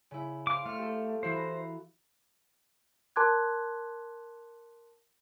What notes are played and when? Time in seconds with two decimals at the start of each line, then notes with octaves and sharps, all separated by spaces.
0.11 C#3 E4
0.47 C5 F5 D6
0.66 A3 F5 F6
0.78 G4 A4
1.23 E3 E4 F#4 C5
1.35 A#5
3.16 A#4 A5 C6 D6 F#6 G#6